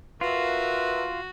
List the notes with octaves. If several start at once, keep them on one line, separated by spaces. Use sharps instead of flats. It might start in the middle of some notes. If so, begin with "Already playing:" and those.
F4 F#4 A#4 B4 E5